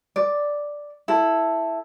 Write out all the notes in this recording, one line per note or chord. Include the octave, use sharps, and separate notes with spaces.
D5
E4 A4